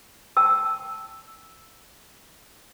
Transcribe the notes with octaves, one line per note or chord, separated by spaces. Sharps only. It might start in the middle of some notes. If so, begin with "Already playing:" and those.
G5 A5 E6